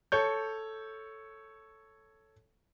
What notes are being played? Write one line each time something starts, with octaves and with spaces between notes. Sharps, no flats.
A4 C#5 G6